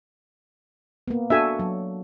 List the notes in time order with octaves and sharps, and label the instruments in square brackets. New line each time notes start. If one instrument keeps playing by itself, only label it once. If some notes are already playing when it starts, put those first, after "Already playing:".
[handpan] A#3 B3
[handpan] D4 F#4 A4 [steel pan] E5 G#5
[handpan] F#3